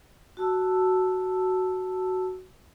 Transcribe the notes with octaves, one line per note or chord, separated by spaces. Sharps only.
F#4 A5 E6